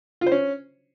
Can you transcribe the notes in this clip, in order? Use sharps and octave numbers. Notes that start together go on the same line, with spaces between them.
F4
C5
C#4